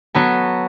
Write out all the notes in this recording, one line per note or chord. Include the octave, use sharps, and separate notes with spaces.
F#3 B3 F#4 A4